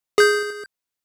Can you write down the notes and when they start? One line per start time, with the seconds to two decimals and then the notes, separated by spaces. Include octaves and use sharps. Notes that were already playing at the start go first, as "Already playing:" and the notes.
0.18 G#4 G6